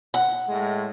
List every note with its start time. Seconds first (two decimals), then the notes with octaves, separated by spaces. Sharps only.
0.14 F#5
0.47 A2 G#3